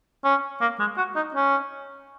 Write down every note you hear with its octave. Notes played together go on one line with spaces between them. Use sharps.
C#4
A#3
G#3
F#4
D#4
C#4